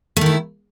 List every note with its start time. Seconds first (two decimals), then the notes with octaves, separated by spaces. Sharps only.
0.17 A3
0.21 D#3
0.26 E4